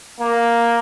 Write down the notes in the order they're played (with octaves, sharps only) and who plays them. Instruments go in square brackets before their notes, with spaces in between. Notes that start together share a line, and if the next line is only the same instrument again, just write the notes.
[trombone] A#3